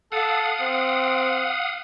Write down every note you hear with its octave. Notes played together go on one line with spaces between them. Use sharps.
A4 F5 F#5 D#6
C4